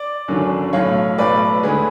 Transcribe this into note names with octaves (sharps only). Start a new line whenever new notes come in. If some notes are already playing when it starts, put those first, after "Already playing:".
Already playing: D5
G#1 F#2 D3 F#3
B1 A2 F#3 C#5 F5
B1 A2 F#3 B4 D5
D2 D3 G#3 G#4 B4